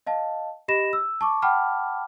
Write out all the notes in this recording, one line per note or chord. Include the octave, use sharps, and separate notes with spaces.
D#5 F5 A5
G4 D#5 B5 A#6 E7
E6
A5 C#6 D6
F#5 G5 A5 B5 D6 F6